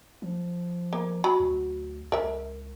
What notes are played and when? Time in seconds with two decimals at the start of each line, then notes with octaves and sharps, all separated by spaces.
0.22 F3
0.93 A#3
1.24 F#3 B5
1.40 D2
2.12 C#2 A#4 E5